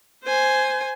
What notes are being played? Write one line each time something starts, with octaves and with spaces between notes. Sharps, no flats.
C5 G#5